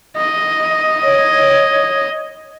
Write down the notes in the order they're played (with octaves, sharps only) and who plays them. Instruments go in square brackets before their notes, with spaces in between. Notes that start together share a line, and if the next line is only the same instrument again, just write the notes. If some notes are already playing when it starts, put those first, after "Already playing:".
[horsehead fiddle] D#5
[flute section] C#5